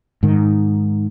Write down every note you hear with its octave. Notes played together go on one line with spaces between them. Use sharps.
G#2 D#3